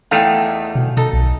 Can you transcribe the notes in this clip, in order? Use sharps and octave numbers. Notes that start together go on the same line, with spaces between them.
E2 A3 D#4 G#4 F5 G5
B2
B2 D#4 A4
B1